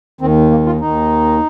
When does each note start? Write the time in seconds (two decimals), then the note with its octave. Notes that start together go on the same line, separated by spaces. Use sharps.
0.21 D#2 D#3 C4
0.51 A#3
0.66 F4
0.80 D#2 D#3 D#4